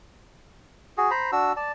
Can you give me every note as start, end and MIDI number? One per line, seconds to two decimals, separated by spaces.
0.98 1.11 66
0.98 1.11 68
1.11 1.31 72
1.11 1.31 82
1.11 1.31 83
1.32 1.52 62
1.32 1.52 66
1.32 1.52 88
1.57 1.72 74
1.57 1.72 81